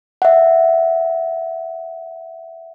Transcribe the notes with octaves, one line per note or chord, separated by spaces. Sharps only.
E5 F#5